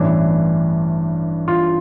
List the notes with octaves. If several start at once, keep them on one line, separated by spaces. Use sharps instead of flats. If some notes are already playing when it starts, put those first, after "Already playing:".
Already playing: A1 G2 E3 D4
F4